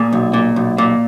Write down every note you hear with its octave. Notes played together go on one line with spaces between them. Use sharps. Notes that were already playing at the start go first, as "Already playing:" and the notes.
Already playing: A#2 G#4
B1
A#2
B1
A#2